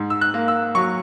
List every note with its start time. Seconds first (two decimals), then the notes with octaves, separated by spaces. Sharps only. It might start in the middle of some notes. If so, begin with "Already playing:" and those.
Already playing: G#2
0.10 E6
0.21 F#6
0.34 A#3
0.48 E6
0.75 F#3 C#6